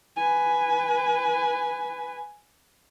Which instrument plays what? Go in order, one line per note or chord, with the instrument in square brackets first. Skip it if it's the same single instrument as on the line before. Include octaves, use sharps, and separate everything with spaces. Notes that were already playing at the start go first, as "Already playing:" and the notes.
[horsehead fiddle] B4 G#5